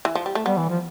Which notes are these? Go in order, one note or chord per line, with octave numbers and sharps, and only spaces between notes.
E3
F3
G3
A3
G3 B3
E3
F3